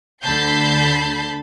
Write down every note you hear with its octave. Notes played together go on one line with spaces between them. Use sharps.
D2 D3 A5 B5 G6 C7